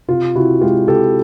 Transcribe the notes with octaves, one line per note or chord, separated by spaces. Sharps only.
C3 F4
C3 E4 F#4
G#3 F4 G4
C3 G4 A4